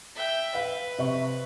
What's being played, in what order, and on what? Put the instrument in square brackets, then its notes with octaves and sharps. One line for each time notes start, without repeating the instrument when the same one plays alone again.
[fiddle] E5 G5
[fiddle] B4 [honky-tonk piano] F5
[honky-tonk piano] C3 E5 C#6